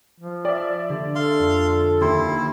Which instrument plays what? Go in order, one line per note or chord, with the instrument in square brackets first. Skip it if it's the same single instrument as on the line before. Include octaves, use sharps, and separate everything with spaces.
[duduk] F3
[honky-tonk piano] D5 E5
[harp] D3 A#3 G4
[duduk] A4 [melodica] F5 C6
[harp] F2
[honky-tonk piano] D#2 C6 [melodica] E4 [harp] E5